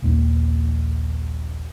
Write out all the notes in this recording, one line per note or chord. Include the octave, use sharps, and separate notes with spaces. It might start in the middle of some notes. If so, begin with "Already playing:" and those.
A#1 D#2 A#3